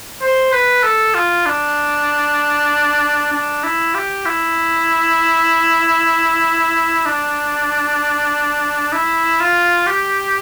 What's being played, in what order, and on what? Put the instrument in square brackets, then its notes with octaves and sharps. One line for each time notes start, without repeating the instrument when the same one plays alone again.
[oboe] C5
B4
A4
F4
D4
D4
E4
G4
E4
D4
E4
F4
G4